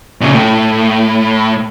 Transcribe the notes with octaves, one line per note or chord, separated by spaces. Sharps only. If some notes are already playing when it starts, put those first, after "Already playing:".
A#2 C#3
A2